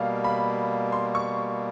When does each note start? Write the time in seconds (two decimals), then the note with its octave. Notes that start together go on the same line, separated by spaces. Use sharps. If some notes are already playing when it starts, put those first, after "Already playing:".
Already playing: B2 G3 A#3 F5
0.24 B5
0.92 C6
1.15 C#6